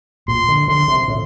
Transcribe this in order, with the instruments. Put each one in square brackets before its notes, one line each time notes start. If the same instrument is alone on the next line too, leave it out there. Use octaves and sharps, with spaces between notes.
[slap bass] A#2 [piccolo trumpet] C6
[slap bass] D3
[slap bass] D3 [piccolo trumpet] C6
[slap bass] C3
A2